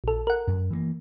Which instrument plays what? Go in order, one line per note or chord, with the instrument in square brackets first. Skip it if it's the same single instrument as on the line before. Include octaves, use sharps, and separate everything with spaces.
[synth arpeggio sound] A#1 A4
A#4 F#5
[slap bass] F#2
E3 G#3 A#3